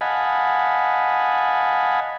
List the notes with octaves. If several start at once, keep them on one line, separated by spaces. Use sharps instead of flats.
D#5 F5 F#5 G#5 A5 B5